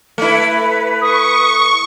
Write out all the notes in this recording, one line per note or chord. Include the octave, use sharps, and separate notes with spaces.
A3 E4 B4
C#6 D#6